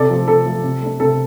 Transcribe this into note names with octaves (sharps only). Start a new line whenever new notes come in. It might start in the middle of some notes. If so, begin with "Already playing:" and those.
Already playing: C3 A4 D5
F3 A3
C3 A4
F3 A3
C3
A3 D4
C3 A4